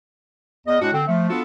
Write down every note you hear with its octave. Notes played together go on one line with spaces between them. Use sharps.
E2 D#5
A2 G#3 D4 F#4
D3 C4
F3 A3
B3 D4 F4 F#4 A4